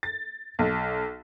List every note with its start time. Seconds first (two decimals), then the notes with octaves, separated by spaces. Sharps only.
0.03 A6
0.59 B1